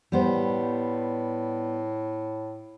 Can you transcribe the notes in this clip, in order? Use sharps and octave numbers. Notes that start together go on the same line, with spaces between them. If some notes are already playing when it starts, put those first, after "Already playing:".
A2 G3 B3 C5